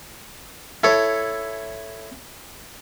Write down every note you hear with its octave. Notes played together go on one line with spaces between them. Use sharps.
E4 A4 C#5